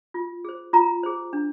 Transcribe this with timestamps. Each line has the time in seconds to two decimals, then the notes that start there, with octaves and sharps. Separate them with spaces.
0.14 F4
0.45 G#4 C5
0.73 F4 A#5
1.03 G#4 C5
1.33 D4